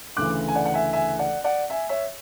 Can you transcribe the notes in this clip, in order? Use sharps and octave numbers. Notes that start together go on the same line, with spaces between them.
D2 C#3 E3 D6 F#6
G#5
D5 F#5
F#5
E5 G#5
E5 G#5
D5 F#5
D5 F#5
E5 G#5
C#5 E5